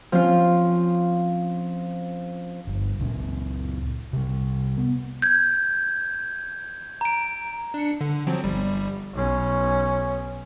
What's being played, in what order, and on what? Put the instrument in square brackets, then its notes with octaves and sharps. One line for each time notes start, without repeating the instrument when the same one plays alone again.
[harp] F3 C4 C#4 F4
[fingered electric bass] G1
C#2 A#2 C#4
C3 G3
B3
[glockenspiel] G6 G#6
A#5 D7
[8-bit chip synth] D4 C#7
D3
F3 F#3 C4
G1 G3
[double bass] B1 C#4